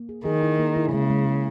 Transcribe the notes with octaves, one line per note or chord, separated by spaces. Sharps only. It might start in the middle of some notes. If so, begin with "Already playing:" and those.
Already playing: A#3
G#4
D#3 G#4
E4
A#3
E4
C#3 G#3
G#3
G#3